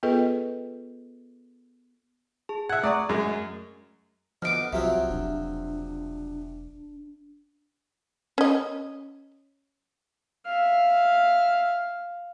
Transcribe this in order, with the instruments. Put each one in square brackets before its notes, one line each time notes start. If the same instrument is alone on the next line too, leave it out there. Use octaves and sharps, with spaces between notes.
[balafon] B3 F4 G#4 A4 B4 D#5
[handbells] G#4 A5
[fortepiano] E5 F#5 [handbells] G#6
[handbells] A3 A#5 C#6 [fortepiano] D5
[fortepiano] F#2 G#3
[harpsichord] D2 B3 D6 [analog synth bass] F3 [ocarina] D#5 [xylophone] F6 D7
[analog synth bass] C2 [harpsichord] C3 F3 F#3 [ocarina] F#4 [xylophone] E5
[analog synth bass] E1 [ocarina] D4
[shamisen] C#4 D#5
[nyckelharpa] E5 F5